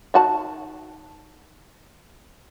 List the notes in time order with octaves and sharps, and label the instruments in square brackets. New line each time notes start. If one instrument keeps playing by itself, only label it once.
[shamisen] D#3 F#4 A5